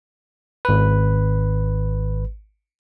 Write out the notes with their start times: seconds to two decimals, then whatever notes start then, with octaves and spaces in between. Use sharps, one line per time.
0.65 G#1 B4